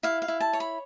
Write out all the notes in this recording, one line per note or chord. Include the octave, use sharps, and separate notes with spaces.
E4 F5
F5
E4
A5
C#5
B5